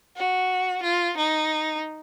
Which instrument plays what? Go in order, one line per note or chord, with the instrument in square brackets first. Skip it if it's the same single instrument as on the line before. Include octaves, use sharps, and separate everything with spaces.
[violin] F#4
F4
D#4